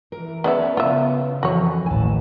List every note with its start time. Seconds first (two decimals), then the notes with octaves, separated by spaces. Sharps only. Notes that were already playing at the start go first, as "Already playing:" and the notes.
0.12 E3 A#4
0.44 B3 C#4 G#4 B4 D5 E5
0.77 C#3 B3 F4 E5
1.43 F2 E3 F#4 C#5
1.86 A1 D#2 A2 G#5 A5